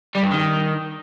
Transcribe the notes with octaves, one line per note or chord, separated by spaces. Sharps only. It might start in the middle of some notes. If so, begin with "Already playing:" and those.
G3
G2
D#3